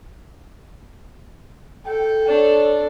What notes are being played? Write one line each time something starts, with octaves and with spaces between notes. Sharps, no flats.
A4 G5
D4 C#5